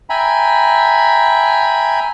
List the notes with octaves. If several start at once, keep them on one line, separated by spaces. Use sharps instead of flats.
E5 G5 G#5 A#5 B5